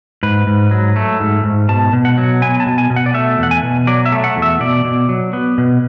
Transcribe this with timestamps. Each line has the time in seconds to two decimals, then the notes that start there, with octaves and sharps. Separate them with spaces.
0.23 G#2 B4
0.47 G#2
0.71 F#3
0.96 A3
1.20 G#2
1.44 G#2
1.69 B2 A5
1.93 B2
2.05 F#5
2.18 F#3
2.42 B3 G#5
2.60 A5
2.66 B2
2.78 G#5
2.90 B2
2.96 F#5
3.06 D5
3.14 A3 E5
3.39 E2 F#5
3.51 G#5
3.63 B2
3.87 F#3 D5
4.06 E5
4.12 A3
4.24 F#5
4.36 E2
4.42 E5
4.60 B2 D5
4.85 B2
5.09 F#3
5.33 B3
5.58 B2